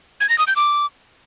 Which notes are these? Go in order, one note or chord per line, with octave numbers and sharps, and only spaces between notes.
G#6
A#6
D#6
G6
D6